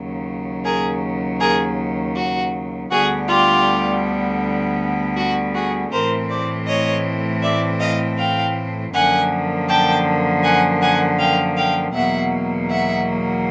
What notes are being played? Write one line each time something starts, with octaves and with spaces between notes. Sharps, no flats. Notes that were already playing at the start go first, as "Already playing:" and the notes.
Already playing: D#2 C#3 F#3
G#4 A#4
G#4 A#4
F#4
D2 D3 G3 B3 F#4 G#4
F4 G4
F#4
F#4 G#4
A2 E3 A3 C4 A#4 C5
C5 D5
C#5 D#5
D5 E5
D#5 F5
F5 G5
F#2 D3 F3 A#3 F#5 G#5
G5 A5
F#5 G#5
F#5 G#5
F5 G5
F5 G5
E2 B2 F#3 A#3 E5 F#5
E5 F#5